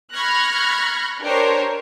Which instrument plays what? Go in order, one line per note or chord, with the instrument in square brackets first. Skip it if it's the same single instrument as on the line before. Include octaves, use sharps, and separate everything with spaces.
[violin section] B5 C#6 F6 F#6 G#6 A#6
D4 G4 A#4 C5 C#5